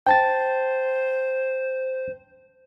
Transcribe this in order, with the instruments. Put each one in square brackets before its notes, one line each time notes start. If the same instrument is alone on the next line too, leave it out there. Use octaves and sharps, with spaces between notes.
[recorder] C5 [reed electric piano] G5 A5 A6